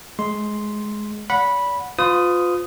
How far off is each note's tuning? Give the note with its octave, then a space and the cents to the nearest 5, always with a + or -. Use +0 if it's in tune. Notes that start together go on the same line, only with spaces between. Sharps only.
G#3 +15 C6 +0
D5 -40 F#5 -15 B5 -10
F4 +20 B4 +45 D#6 +0